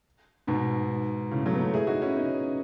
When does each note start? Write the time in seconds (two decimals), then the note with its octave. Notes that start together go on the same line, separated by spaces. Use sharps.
0.47 G#2 B2
1.31 A2 C#3
1.46 F#3 A3
1.55 B3
1.59 A3 C#4
1.74 E4 G#4
1.87 D#4 F#4
2.02 C#4 E4
2.16 B3 D#4